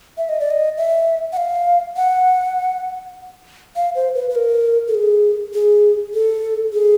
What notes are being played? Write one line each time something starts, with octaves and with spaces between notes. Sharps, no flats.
E5
D#5
D5
D#5
E5
F#5
F5
F#5
F5
C5
B4
B4
A#4
A4
G#4
G#4
A4
G#4